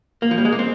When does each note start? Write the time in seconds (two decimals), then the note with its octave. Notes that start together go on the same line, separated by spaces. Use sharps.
0.22 A#3
0.31 F3
0.38 G3
0.45 G#3
0.52 A#3
0.59 C4